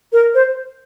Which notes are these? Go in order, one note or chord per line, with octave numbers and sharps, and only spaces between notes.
A#4
C5